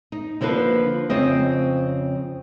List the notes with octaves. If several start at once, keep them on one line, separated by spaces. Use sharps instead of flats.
D#4
D3 F3 A#3 D4 B4
F2 C#3 C4 D#5